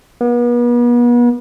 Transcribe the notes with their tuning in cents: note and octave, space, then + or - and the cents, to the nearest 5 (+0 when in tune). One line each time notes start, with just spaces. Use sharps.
B3 -40